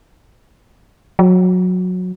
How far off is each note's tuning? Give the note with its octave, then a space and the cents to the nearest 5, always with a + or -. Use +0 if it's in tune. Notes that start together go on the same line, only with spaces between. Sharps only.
F#3 -20